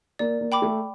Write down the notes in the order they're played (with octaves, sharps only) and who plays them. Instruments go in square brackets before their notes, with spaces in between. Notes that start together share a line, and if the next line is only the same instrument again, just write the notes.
[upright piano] A#3 [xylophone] D5
[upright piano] A#3
[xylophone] G5 B5 D6
[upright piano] A3